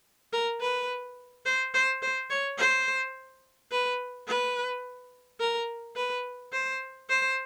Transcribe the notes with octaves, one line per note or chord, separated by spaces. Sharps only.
A#4
B4
C5
C5
C5
C#5
C5
B4
B4
A#4
B4
C5
C5